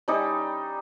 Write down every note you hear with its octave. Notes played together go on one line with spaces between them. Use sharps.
G3 C#4 D#4 G4